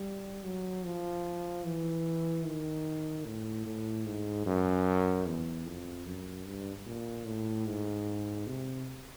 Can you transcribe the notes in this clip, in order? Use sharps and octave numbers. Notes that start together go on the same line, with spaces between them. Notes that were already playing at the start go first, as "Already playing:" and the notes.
Already playing: G3
F#3
F3
E3
D#3
A2
A2
G#2
F#2
E2
F2
F#2
G2
A#2
A2
G#2
C3